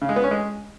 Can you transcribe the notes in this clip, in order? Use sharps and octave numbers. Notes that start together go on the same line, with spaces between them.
C#3
G#3
B3
C#4
G#3